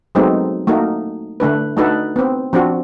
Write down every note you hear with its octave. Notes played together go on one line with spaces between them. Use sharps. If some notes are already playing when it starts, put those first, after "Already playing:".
F#3 G#3 A3 B3 C4 D#4
A3 A#3 D#4 F#4
D3 A3 D4 B4
A3 D4 D#4 F#4 A4 B4
B3 C4
F3 C4 D4 F#4